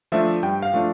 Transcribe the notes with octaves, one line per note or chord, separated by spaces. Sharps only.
F3 A3 D4 E5
G2 G5
F5
F3 A3 D4